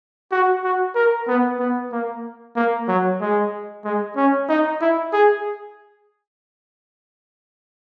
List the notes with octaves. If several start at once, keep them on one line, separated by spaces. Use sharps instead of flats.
F#4
F#4
A#4
B3
B3
A#3
A#3
F#3
G#3
G#3
C#4
D#4
E4
G#4